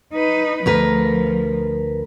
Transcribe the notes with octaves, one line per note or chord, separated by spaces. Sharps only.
D#4 B4
D2 F3 A#4 B4